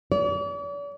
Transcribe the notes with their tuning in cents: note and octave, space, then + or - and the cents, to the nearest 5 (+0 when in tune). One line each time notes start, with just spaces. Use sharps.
D5 -45